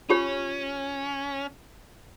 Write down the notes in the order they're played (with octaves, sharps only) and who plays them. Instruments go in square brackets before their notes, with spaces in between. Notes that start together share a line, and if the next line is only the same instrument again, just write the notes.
[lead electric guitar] C#4 [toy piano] F4 G4 C#5